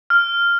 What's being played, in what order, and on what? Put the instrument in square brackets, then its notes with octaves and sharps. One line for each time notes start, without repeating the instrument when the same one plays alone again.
[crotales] F6